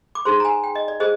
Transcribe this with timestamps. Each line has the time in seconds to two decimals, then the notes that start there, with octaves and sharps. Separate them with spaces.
0.15 D6
0.25 D#4 G#4 C5 C6
0.40 A#5
0.45 G#5
0.64 G5
0.75 D#5
0.88 D5
1.00 G#4 C5 D#5